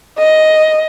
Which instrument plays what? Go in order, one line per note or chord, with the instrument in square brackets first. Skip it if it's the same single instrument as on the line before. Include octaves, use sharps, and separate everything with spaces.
[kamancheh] D#5